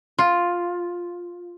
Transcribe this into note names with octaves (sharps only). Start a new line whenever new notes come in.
F4